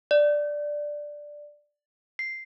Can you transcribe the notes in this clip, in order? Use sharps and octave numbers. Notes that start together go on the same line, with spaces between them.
D5
C7